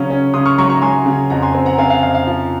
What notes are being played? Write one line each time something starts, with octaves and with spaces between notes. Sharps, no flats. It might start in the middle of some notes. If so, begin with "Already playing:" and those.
Already playing: C#3 F#3 C#4
C#4
C#3 C6 D#6
C#6 F6
F#3 A#5 C#6
A#5 C#6
F#3 G#5 C6
C#3
F2 F#5 A#5
G#5 C6
C4
F#5 A#5
C4 F5 G#5
F5
F2 F5
F5
F3